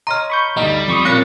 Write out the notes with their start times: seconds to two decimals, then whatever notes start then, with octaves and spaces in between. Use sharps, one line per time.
0.07 C#5 D#5 A#5 C6 F6
0.30 B5 C#6 G6
0.57 D2 G2 G3 D#4
0.88 F2 B5 C#6 D#6
1.05 A#2 A#3 C4 C#4 F#6 B6 C#7